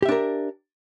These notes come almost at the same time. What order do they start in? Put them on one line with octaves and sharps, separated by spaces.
G4 E5 D4 A#4